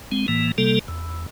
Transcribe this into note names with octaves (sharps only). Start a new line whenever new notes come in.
G#3 C4
A2 E3 A#3
C3 G3 A#3 A4
E2